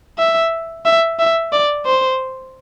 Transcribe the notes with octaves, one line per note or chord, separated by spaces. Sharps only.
E5
E5
E5
D5
C5